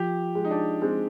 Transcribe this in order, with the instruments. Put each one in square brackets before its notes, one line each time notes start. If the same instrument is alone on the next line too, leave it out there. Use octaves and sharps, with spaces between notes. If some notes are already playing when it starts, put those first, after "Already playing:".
Already playing: [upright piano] F3 [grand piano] G4
[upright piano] G#3
[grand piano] D#4
D4
[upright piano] G#3 [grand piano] C4